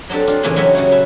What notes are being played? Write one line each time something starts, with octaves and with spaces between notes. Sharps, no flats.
F#3 C4 D4 G4 A4
D4 F4
A#2 C#3 E3 C4 C#4 G4
F#3 C#4 B4 C#5 D#5 E5
C#3 F#4 C#5
B4 E5